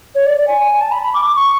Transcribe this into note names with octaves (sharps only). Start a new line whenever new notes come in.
C#5
D5
D5
G#5
G#5
A5
B5
B5
D6
D6
C#6